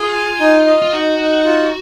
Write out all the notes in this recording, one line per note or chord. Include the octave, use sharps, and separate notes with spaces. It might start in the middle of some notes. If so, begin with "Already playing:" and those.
Already playing: F4 G#4
G#5
D#4
D#5
F4
D#4 F#4
D#4
F4